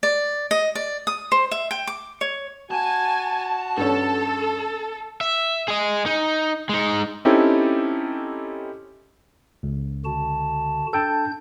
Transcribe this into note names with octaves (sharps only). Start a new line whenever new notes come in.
D5
D#5
D5
D#6
C5
E5
G5
D6
C#5
F#4 G#5 A5
G2 C#4 A4
E5
G#4 D#5
D#4
G#3 D#4
C4 C#4 D#4 E4 G4 A4
C#2
D3 F#4 A5
D4 A4 G5 A5 G6